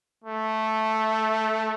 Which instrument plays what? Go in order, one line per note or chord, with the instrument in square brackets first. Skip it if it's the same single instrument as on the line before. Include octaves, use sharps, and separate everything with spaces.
[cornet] A3